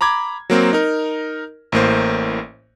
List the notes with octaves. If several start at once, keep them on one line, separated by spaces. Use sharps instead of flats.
A#5 B5 D6 G#6
F#3 A#3 C4
D#4 A#4
A1 A2 A#3 C5